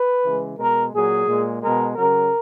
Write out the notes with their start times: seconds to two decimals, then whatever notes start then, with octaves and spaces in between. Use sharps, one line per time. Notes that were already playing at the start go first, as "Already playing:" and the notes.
Already playing: B4
0.24 C#3 E3 G#3
0.58 B2 G#3 A#4
0.92 A#2 F#3 G#4
1.26 A#2 G#3
1.61 B2 G#3 A#4
1.96 C#3 F#3 A#4